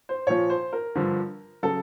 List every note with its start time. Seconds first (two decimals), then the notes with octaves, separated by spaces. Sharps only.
0.09 C5
0.27 A#2 F3 C#5
0.50 C5
0.73 A#4
0.95 G2 D3 F3
1.63 C#3 F#3 A4